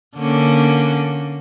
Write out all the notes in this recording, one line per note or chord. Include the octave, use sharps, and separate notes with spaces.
D3 A#3 C#4